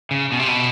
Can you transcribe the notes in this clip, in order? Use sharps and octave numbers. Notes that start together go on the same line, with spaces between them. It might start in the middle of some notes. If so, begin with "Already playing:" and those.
C#3
B2
C3
B2